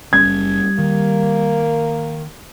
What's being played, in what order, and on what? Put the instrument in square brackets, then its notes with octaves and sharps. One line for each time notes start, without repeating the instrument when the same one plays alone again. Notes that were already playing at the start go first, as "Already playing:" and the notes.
[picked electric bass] F#1 C#4 [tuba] G3 [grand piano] G#6
[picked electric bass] D#3 [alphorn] A#3